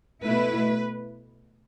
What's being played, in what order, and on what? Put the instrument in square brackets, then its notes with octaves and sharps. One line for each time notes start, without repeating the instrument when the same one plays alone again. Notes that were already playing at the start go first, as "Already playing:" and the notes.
[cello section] B2 A3 E4 B4